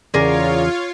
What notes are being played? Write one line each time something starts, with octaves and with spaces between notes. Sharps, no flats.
E2 C#3 F4 G#4 A#4 C#5 D5 F5